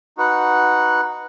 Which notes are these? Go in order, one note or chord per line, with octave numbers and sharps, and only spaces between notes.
D#4 F#4 B4 F#5